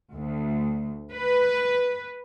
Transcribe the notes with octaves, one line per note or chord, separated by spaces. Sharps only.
D2
B4